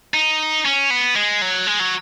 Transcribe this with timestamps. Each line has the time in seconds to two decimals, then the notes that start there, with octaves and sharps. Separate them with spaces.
0.14 D#4
0.65 C#4
0.90 B3
1.15 G#3
1.42 F#3
1.67 G#3
1.80 F#3